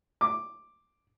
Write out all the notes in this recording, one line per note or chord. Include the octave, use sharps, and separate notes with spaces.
D6